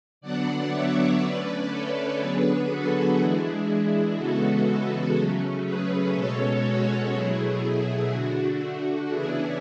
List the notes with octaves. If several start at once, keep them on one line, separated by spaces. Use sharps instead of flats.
D3 F#3 B3 D4 D5 F#5
C#5 E5
D3 A3 C#4 B4 D5
A4 C#5
D3 F#3 B3 D4 G#4 B4
F#4 A4
E3 G#3 D4 E4 G#4
C#3 E3 G#3 B3 F#4 A4
C#3 F#3 A3 C#4
G#4 B4
B2 G#3 C#4 A4 C#5
F#4 A4
B2 F#3 A3 E4 G#4
E4
D3 A3 D4 F#4
C#3 E3 B3 D4 E4 G#4